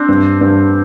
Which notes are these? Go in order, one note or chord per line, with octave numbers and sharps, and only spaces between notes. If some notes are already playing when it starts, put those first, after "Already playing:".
Already playing: C4 D4
G2
G2